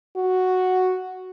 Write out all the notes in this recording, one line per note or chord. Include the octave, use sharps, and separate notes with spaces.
F#4